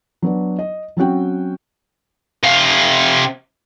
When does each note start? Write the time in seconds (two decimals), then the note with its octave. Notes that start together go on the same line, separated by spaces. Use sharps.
0.22 F#3 B3 D4
0.59 D#5
0.97 F#3 C4 C#4 F#4 G5
2.44 C3 F5